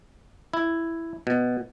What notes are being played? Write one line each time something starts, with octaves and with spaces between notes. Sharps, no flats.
E4
B2